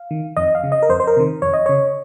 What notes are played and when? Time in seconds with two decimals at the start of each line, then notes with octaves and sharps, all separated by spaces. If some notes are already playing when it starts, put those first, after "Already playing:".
Already playing: F5
0.11 D#3
0.36 F2 D#5
0.55 F5
0.64 C#3
0.72 D#5
0.83 A#4
0.89 F2 C5
1.00 C5
1.07 A#4
1.16 C3 D#3
1.42 F2 C#5
1.53 D#5
1.66 C#3 C#5